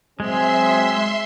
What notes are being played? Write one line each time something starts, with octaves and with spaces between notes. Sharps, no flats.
F#3 G#3 C4 G#4 E5 C6